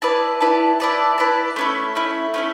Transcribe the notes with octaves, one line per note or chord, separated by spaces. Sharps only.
E4 B4 D5 A5
E4 B4 D5 A5
E4 B4 D5 A5
E4 B4 D5 A5
A3 C#4 E4
A3 C#4 E4
A3 C#4 E4